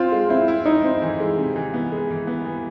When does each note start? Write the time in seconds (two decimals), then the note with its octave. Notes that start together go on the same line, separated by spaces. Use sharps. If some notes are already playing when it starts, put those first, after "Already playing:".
Already playing: C4 F4
0.12 G#3
0.30 C4 E4
0.48 E4
0.65 D#4 E4
0.84 C4
1.02 E3
1.20 G#3
1.38 C3
1.56 E3
1.74 B3
1.92 G#3
2.10 E3
2.27 B3
2.45 E3